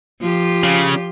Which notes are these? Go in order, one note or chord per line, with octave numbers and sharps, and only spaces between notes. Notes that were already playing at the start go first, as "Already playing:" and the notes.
F3 F4 G4
C#3